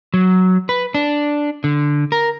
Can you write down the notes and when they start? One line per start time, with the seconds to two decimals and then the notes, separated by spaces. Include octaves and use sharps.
0.14 F#3
0.69 B4
0.95 D4
1.64 D3
2.12 A#4